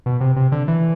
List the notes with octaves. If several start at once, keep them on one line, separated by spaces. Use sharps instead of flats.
B2
C3
C3
D3
E3